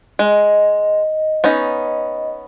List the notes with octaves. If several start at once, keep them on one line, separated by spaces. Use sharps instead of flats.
G#3 D#5
B3 C#4 D#4